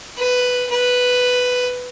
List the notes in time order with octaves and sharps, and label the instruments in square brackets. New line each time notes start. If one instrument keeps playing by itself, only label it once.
[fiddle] B4
B4